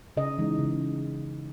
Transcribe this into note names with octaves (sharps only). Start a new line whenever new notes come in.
C#3 D#5
E3 G#3 D#4
C#3